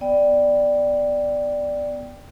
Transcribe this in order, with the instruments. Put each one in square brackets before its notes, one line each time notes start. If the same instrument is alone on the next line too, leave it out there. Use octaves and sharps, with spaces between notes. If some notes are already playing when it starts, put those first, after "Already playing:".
[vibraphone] B3 D5 G5